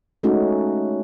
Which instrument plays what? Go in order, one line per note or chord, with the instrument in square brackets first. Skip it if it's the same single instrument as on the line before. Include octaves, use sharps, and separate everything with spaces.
[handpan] G#3 A3 C#4 D#4 F#4